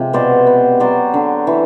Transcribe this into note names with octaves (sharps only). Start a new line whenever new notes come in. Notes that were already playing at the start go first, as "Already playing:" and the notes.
Already playing: C3 F3 G#3 G4
B2 C5 D5
B3
F#3 C5 D5
D3
E3